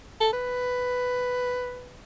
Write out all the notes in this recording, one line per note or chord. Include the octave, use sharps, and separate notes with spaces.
A4
B4